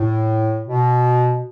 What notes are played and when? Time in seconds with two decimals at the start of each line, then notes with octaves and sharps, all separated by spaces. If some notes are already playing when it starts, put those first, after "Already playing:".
Already playing: A2
0.67 B2